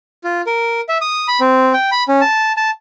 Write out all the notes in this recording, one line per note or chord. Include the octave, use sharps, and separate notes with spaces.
F4
A#4
E5
D#6
B5
C4
G5
B5
C#4
A5
A5